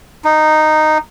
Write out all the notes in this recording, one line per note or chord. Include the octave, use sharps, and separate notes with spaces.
D#4